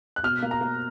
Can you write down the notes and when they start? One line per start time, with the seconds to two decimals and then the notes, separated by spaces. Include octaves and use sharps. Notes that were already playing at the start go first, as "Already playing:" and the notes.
0.16 F#6
0.23 B2 F6
0.43 A#3
0.51 A#5
0.61 A#3